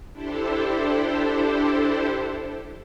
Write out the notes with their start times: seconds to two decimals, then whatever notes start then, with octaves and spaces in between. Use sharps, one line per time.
0.12 D4 E4 G4 A4 C5